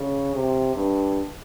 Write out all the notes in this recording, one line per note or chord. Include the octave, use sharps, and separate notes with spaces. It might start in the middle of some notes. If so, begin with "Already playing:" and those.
Already playing: C#3
C3
G2